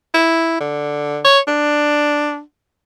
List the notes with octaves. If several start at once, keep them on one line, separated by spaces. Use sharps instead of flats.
E4
D3
C#5
D4